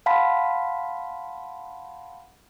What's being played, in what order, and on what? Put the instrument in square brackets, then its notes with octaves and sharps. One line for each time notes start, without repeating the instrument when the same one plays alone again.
[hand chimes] F5 F#5 A5 B5 C6 B6